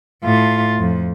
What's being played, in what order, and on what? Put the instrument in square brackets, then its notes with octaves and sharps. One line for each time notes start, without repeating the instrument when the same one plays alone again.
[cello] A2 F4
F2